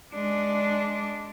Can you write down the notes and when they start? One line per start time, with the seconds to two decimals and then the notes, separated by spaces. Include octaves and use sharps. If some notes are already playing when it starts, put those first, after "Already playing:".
0.14 G#3 D4